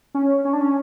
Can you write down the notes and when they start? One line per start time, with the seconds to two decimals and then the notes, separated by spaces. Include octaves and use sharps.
0.14 C#4
0.45 C#4
0.53 D4
0.61 C#4